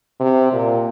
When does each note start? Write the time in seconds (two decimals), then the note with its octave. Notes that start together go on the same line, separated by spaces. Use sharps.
0.20 C3
0.52 A#2